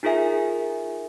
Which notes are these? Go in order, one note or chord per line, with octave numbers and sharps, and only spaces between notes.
D#4 F4 G#4 A#4 E5 G#5